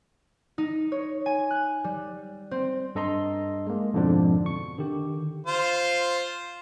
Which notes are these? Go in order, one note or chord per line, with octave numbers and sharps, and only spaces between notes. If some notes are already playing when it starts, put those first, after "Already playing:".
D#4
C#5
G#5
F#6
G3
C4
G2 A4 D#5 A#5 C6
G#3 A#3
F2 G#2 B2 D3 F3 D4
C#6
D3 D#3 G4
F4 C5